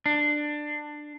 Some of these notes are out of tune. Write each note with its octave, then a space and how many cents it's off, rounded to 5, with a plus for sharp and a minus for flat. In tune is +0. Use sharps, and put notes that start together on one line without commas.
D4 +15